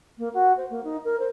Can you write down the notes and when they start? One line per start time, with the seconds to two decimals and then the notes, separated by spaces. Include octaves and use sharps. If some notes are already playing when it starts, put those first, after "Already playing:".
0.18 A#3
0.33 F#4
0.57 C5
0.70 A#3
0.83 D#4
1.04 A#4
1.19 C5